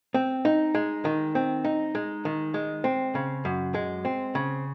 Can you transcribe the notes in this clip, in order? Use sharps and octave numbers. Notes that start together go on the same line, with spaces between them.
C4
D#4
G#3
D#3
C4
D#4
G#3
D#3
G#3
C4
C#3
F#2
G#3
C4
C#3